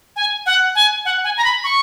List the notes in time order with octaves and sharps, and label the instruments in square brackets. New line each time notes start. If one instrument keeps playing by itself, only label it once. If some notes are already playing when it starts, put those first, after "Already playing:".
[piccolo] G#5
F#5
G#5
F#5
G#5
A#5
B5
C#6